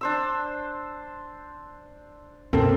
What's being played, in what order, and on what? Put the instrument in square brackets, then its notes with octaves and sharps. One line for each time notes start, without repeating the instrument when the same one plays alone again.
[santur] D4 C5 E6
[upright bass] F#2 B2 [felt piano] A#3 C4 A4